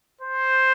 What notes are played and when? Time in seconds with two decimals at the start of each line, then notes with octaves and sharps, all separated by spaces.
0.21 C5